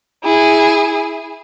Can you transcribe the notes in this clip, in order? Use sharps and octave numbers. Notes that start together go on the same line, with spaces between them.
E4 G#4